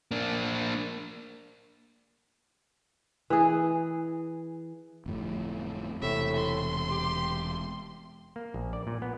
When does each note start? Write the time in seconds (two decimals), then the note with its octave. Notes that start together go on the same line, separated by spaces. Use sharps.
0.11 A#3 D4
3.30 E3 G#4
5.06 G1 F2 A2
6.02 E1 A2 C3 E5
6.36 C6
6.91 G4
8.36 A#3
8.54 A#1
8.73 D5
8.87 A#2
9.02 B3